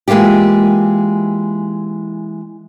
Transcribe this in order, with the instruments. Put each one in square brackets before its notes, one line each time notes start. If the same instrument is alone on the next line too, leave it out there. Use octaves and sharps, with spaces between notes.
[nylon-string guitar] E3 G#3 A#3 F4 G4